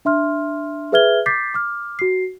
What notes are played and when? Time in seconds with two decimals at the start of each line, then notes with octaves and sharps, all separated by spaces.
0.05 D4 E5 C6 F6
0.92 G#4 B4 E5 F6 G#6 G7
1.26 D6 G6 A6 B6 C7
1.54 D6 F6
1.99 F#4 C7